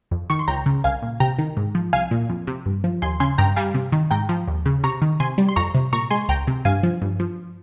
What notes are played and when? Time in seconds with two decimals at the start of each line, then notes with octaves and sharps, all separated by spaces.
0.11 F2
0.30 D#3 C#6
0.39 C6
0.48 C#2 G5 A#5
0.66 C#3
0.84 C2 F5 G#5
1.02 A#2
1.20 C3 G5 A#5
1.39 D#3
1.57 G#2
1.75 F3
1.93 C2 F5 G#5
2.11 A#2
2.29 F2
2.47 C3
2.66 G2
2.84 F3
3.02 D#2 G#5 C6
3.20 C#3 G#5 C6
3.38 G2 G5 A#5
3.56 G3 F5 G#5
3.74 C3
3.92 D#3
4.11 G#2 G5 A#5
4.29 F3
4.48 D#2
4.66 C#3
4.84 C3 A#5 C#6
5.02 D#3
5.20 C3 G#5 C6
5.38 G3
5.49 C6
5.56 F2 A#5 C#6
5.75 C3
5.93 A#2 A#5 C#6
6.10 G#3 G#5 C6
6.29 C#2 G5 A#5
6.47 C3
6.65 G2 F5 G#5
6.83 F3
7.02 G2
7.20 F3